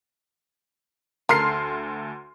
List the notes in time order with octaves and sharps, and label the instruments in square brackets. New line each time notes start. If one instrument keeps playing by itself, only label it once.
[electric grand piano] D2 A4 [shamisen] A#4 [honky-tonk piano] C6 F6 C7